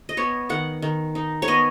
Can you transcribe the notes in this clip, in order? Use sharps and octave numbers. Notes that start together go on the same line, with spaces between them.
D#5
B3 C#5
D#3 F#5
D#3
D#4
C#5
B3 D#5